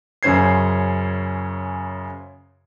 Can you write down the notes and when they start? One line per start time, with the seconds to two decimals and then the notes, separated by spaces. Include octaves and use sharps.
0.23 F#2 C#3 C#4 C5 G#6 C7